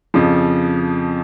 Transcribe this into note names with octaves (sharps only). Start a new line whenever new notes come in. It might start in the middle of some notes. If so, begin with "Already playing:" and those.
F2 C#3 F3